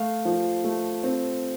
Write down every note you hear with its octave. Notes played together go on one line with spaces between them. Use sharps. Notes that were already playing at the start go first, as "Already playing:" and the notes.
Already playing: A3 F5
F3
A3
C4